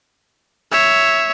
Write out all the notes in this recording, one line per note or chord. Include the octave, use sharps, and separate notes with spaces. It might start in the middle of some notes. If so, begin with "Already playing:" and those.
C#5 E5